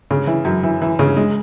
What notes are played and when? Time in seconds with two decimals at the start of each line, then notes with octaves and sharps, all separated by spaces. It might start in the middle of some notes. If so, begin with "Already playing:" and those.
0.11 C#3
0.27 E3
0.45 F#2
0.63 E3
0.82 E3
0.99 C#3
1.17 G#3